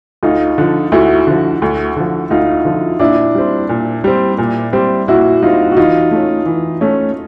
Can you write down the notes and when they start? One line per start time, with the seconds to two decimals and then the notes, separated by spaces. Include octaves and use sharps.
0.23 D2 D#4 F4
0.58 D3 F3
0.92 D2 E4 F#4
1.27 D3 F3
1.62 D2
1.96 D3 F3
2.30 D2 D#4 F4
2.65 D3 F3
2.99 A#2 D4 E4
3.35 G3 C4
3.69 A#2
4.04 G3 C4
4.38 A#2
4.73 G3 C4
5.08 A#2 E4 F#4
5.42 G3 C4 D#4 F4
5.72 F#4
5.77 E3 D#4 F4
6.11 A3 C#4
6.46 E3
6.81 A3 C#4